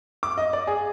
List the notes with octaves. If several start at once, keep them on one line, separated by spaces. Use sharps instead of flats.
D6
D#5
D5
G#4